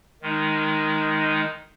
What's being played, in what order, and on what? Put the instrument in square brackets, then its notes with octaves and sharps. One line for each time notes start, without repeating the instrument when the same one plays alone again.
[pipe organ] D#3 G#3 D#4